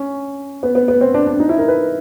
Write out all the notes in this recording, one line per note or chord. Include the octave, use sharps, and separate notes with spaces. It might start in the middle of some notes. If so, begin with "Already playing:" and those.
Already playing: C#4
B3
B3
B3
C4
D4
D4
D#4
E4
A#4
B4